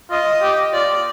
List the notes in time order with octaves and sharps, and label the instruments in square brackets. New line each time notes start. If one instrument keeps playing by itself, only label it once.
[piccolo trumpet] F4 [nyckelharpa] D#5
[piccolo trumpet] G4
[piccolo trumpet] F4 [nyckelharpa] D5